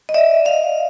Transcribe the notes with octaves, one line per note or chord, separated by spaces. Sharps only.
D#5
D5 E5
D#5 F5